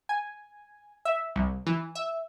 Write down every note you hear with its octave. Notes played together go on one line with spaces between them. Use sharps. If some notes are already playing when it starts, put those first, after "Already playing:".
G#5
E5
C2
E3
E5